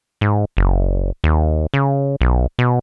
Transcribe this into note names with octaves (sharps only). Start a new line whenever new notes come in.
G#2
F#1
D#2
C#3
B1
B2